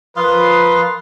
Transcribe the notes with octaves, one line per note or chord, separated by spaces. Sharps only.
F3 F4 A#4 B4 F5 C6 D#6